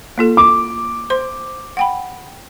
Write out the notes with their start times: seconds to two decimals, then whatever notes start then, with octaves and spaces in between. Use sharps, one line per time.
0.18 A#3 F4 A4
0.37 D6
1.10 C5 C6
1.77 F#5 G5 B5